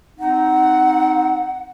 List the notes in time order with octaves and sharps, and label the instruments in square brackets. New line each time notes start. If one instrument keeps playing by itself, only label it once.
[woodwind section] C4 D#4 [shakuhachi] F#5